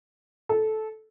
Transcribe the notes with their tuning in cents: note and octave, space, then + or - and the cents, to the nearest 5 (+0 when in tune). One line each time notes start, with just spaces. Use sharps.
A4 -15